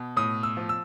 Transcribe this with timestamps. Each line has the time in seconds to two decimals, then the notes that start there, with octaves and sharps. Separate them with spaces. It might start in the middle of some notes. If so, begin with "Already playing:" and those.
Already playing: B2 B3
0.16 A2 D#6
0.43 E6
0.57 F3
0.69 E6